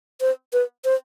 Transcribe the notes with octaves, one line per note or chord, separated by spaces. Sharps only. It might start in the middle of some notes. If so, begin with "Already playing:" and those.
C5
B4
C5